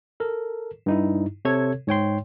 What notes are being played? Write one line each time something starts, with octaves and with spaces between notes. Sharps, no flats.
A4 A#4
G2 D#4 E4
C3 A4 C#5 G#6
G#2 C#5 G5 C6